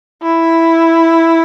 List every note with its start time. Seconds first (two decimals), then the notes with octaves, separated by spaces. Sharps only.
0.23 E4